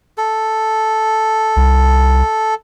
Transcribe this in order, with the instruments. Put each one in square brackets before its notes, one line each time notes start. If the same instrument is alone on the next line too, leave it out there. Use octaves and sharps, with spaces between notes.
[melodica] A4
[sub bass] C2